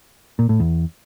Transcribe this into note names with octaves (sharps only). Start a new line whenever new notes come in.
A#2
A2
E2